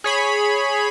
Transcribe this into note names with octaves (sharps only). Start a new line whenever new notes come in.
G#4 C#5 B5